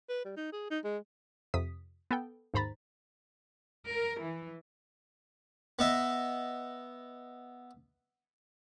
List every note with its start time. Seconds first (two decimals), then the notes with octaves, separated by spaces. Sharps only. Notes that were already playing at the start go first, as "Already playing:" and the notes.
0.09 B4
0.25 G3
0.37 D#4
0.53 G#4
0.71 D#4
0.85 G#3
1.54 F2 C3 D#6 B6
2.11 B3 A4 G5
2.54 D#2 G#2 C5 A#5 B5 A6
3.86 A#4
4.20 E3
5.79 B3 D#5 E5